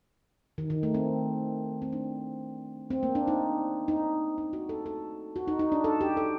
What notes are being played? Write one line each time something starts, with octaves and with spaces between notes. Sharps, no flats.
D#3
D#3
A3
C4
C4
D4
C4
A#3
D4
D#4
D#4
D#4
F#4
A4
A4
F#4
D#4
D#4
D4
A4
G4
A4